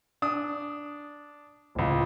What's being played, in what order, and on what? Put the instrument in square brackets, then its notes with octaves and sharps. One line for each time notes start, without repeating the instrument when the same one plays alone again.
[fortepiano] D4 D#6
[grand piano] D1 C#2